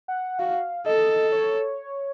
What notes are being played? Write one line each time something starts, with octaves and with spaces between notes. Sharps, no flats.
F#5
F#4 F5
A4 D#5
C#5